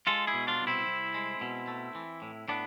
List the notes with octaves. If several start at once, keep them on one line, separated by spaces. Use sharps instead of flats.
G#3 F4 A4
E4 G#4
B2
D4 F4
C2
C4 E4
C2
G#3
B2
A3
E3
A2
A2 B3 D4